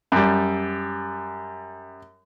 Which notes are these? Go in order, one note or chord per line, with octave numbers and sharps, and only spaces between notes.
F#2 G3